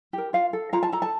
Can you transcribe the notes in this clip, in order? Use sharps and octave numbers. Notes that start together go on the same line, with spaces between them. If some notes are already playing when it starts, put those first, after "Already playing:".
G4 A#4
F4 F5
A4
F4 A#5
A5
A4 A#5
A5